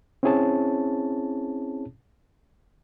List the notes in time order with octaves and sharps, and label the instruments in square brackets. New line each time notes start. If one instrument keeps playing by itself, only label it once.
[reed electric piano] C4 C#4 E4 G#4 C#5 A5